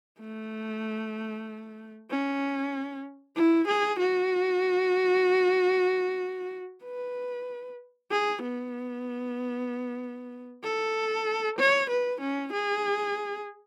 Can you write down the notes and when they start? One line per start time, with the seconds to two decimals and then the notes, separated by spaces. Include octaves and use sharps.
0.20 A3
2.10 C#4
3.36 E4
3.68 G#4
3.99 F#4
6.84 B4
8.11 G#4
8.42 B3
10.64 A4
11.59 C#5
11.90 B4
12.21 C#4
12.53 G#4